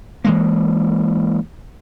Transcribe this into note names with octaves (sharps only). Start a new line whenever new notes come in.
E3 G#3 A#3